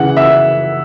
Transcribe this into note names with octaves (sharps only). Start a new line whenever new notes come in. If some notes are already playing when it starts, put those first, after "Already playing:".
Already playing: C#3 E3 F#5
E5